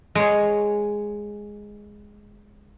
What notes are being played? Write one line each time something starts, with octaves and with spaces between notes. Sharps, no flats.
G#3 C#5